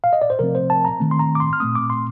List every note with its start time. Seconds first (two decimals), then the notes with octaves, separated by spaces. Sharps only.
0.04 F5
0.13 D#5
0.22 D5
0.30 C5
0.39 C3 F3 A3 C4 A#4
0.55 C5
0.70 A5
0.85 A#5
1.00 D#3 A3 C4
1.11 C6
1.19 A#5
1.35 D6
1.40 C6
1.53 F6
1.60 A#2 A3 C4 D#6
1.75 D6
1.90 C6